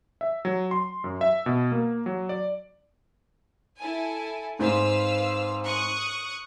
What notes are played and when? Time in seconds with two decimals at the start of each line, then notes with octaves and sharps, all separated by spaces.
0.21 E5
0.45 F#3
0.71 C6
1.04 F#2
1.21 E5
1.46 B2
1.72 A#3
2.06 F#3
2.29 D5
3.78 E4 A4 G#5
4.59 G#2 C4 B4 F5 E6
5.66 C#6 D#6 F#6